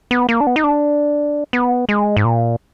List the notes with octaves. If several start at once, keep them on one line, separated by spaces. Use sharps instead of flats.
B3
A#3
D4
B3
D#4
D4
B3
G#3
G#2
A#2